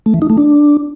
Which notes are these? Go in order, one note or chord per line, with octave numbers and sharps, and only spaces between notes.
A3
E3
D#4
A3
D4